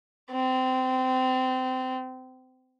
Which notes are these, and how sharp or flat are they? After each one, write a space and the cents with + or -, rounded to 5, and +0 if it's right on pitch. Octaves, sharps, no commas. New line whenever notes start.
C4 -25